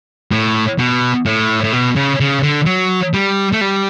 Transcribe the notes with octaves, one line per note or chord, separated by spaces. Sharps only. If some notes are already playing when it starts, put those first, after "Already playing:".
A2
B2
A2
A2
B2
C#3
C#3
D3
F#3
G3
A3
G3